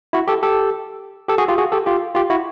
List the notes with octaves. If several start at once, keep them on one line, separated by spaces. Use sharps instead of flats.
E4 F#4
G4 A4
G4 A4
G4 A4
F#4 G#4
F4 G4
F#4 G#4
G4 A4
F4 G4
F4 G4
E4 F#4